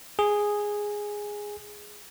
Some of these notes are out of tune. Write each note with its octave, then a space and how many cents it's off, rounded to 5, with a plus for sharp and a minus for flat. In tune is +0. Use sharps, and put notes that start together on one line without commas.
G#4 -5